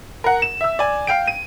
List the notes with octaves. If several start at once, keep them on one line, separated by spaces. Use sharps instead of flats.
A#4 F#5
E7
E5 E6
D5 G#5
F5 G5 D7
D#7